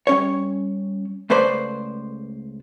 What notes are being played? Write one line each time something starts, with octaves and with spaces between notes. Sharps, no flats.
G3 C#4 C#5
C#2 A3 B4 C5 D5 B5